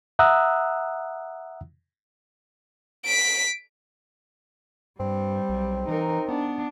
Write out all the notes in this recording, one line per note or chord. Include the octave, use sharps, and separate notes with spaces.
E5 F#5 A#5 D#6 E6 F#6
B6 D7
G2 G3 C4
B1
E3 D#4 A#4
B3 D4